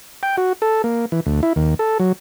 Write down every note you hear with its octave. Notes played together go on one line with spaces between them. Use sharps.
G5
F#4
A4
A#3
E3
D2
E4
D#2
A4
F#3